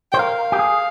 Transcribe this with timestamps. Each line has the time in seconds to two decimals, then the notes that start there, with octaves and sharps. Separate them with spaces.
0.12 C5 G5
0.19 A#4 F5
0.52 G4
0.59 G#4